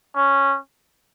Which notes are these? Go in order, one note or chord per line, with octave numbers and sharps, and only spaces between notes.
C#4